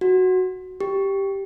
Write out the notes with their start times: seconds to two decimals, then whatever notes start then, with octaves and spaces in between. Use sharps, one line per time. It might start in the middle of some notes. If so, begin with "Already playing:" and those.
0.01 F#4
0.80 G4